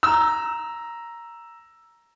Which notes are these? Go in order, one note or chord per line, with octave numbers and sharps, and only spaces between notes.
A#5 E6